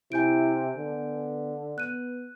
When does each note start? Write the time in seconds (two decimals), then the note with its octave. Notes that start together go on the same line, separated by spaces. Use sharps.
0.12 C3 E4 G#5 G6 D7
0.76 D3 B3
1.78 B3 F#6 D#7